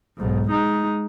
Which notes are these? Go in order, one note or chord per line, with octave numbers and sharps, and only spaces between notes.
B1 G#2
G#3 D#4